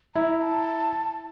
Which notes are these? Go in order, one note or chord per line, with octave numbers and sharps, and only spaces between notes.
E4 A#5
A5